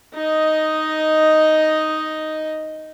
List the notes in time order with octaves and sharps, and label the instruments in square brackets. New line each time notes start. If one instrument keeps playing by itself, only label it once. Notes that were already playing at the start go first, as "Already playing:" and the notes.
[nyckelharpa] D#4 D#5